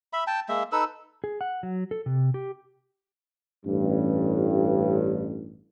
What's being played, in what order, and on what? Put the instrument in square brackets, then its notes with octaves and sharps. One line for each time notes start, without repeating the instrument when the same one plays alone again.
[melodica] E5 B5
G5 A5
G#3 A#3 E5
D#4 A4 B4 E6
[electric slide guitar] G#4
F#5
F#3
A4
C3
G4
[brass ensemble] A1 G2